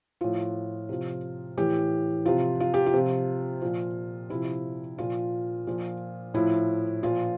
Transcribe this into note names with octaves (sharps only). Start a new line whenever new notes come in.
A2 F3 F4
C3 F3
A2 E3 G4
C3 F3 F4
F4
G4
F4
C3 F3
A#2 F3
C3 F3 E4
A#2 F3 F4
A#2 F3
A2 F3 E4
A#2 F3 F4